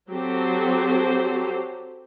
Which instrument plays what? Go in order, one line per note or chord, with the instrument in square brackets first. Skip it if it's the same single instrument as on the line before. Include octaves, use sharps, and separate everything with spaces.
[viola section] F#3 C4 G4 A4 C5